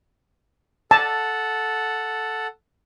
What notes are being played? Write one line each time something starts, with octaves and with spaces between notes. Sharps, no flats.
A4 F#5 A5